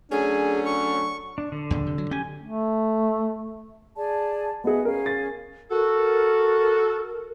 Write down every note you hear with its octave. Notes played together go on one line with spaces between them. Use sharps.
F#3 A3 C#4 D4 G#4
C#6
D4
D3
E2 A#2 C#3
C3
F#3
C#4 G4 G#5
A3
G#4 D5 A5
B3 G#4 D#5 E5 F#5
C#4 G#4 A#4 F5
A6
F#4 A4 A#4